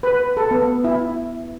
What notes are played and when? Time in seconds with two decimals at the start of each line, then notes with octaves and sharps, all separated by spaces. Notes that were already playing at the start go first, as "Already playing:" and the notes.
0.03 B4
0.37 A4
0.51 B3
0.84 E4